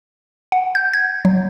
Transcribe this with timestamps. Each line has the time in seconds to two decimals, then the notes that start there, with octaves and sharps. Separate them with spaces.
0.52 F#5
0.75 G6
0.93 G#6
1.25 F#3